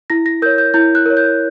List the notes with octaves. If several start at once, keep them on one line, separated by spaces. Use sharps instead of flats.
E4 A#6
A#6
A#4 C#5 G6
G6
E4 G6
F#6
A#4 C#5
G6